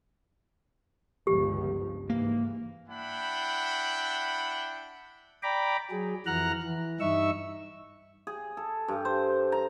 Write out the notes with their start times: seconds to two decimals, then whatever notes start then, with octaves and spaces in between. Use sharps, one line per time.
1.27 G1 C#2 F3 G4
2.10 G#2 E3 A#3
2.88 D4 E4 F#5 G5 B5
5.43 D5 G5 A#5 B5 D6
5.91 F#3 G#4
6.26 F2 E3 F#5 A#5 F6 F#6
6.63 E3
7.00 G2 D#4 E5 C#6 E6
8.27 G#4
8.57 A4
8.88 G2
9.05 C5
9.52 A#5